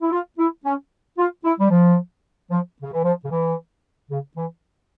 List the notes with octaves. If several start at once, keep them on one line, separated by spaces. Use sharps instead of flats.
E4
F4
E4
C#4
F4
E4
G3
F3
F3
C#3
E3
F3
C#3
E3
C#3
E3